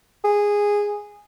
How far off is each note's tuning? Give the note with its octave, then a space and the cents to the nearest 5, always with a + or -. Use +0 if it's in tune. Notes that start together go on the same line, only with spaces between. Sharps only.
G#4 -10